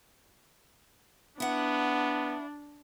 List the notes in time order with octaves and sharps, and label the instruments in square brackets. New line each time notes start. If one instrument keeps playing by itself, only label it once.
[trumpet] B3 [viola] D4 [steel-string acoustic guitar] E4 F#5